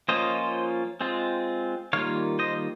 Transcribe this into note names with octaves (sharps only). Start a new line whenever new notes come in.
F3 A#3 C#4 F4 C5 D#5
G#3 C4 F4
D#3 G3 A#3 F4 C#5 F5
C5 D#5